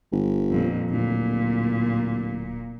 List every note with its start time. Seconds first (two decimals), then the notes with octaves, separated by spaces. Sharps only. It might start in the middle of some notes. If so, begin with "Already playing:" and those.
0.12 G1
0.51 F2 A#2
0.90 D1 A#2